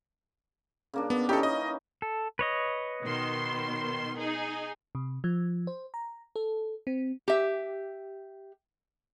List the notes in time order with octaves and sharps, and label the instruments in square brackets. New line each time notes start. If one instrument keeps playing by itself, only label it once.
[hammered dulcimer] C#3 A#3 D4
[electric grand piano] B3
[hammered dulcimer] E3 C#4 D#4 [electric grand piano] G4 A4
[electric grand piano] D#5
[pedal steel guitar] A4
B4 C#5 D#5
[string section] B2 D#3 C6
D#4 G#4
[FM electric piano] C3
F3
C5
A#5
A4
C4
[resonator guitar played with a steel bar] G4 E5